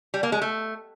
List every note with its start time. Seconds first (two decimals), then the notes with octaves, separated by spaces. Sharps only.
0.14 G3
0.23 A#3
0.32 G#3
0.42 A3